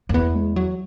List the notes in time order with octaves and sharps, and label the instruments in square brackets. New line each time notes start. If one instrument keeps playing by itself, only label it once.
[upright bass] F#2
[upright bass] E2 [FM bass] B3
[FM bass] G#3
F#3